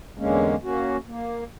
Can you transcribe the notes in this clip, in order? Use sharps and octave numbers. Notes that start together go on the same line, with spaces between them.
E2 D3 G#3 A#3 C#4
A#3 C#4 F#4
A#3